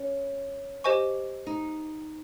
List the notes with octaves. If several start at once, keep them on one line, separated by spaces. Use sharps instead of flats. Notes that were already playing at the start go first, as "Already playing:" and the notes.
Already playing: C#4
G4 C5 D#5 G#5 C#6
D#4